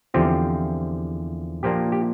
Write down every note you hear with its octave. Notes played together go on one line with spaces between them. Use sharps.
E2 D3 F3 C4 F4 G4
A#2 F3 A#3 D4 G4
G4